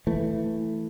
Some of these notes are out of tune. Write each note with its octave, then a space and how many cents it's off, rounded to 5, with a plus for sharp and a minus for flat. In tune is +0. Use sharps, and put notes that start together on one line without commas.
E3 +0 A3 +10